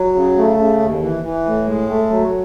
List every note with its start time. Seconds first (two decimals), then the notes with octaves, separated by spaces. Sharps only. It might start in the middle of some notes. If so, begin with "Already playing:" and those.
Already playing: F#3
0.15 C#3
0.37 A3
0.58 C#3
0.80 D#2
1.02 E3
1.23 E3
1.45 A2
1.67 G#3
1.89 A3
2.10 F#3